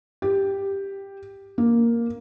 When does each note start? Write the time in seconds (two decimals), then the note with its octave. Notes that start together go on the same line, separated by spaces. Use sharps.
0.22 G4
1.58 A#3